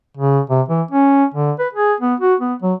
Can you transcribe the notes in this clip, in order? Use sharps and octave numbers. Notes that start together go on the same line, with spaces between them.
C#3
C3
E3
C#4
D3
B4
G#4
B3
F#4
B3
F#3